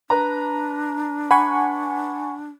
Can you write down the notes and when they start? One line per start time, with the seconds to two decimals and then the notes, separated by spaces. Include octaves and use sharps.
0.10 D4 B4 A#5
1.31 F#5 G#5 B5 C#6